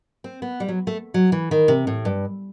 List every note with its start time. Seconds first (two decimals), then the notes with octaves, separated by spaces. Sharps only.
0.24 C4
0.42 B3
0.60 G3
0.68 F#3
0.87 A3
1.14 F#3
1.32 E3
1.51 D#3
1.68 C3
1.87 A2
2.05 G2